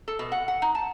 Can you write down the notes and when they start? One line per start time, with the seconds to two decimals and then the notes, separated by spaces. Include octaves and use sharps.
0.08 A4
0.19 B2
0.32 F#5
0.48 F#5
0.62 D#4
0.75 A5